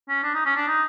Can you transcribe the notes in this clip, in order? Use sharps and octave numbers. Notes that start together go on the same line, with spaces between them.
C#4
D4
D#4
C#4
D4
D#4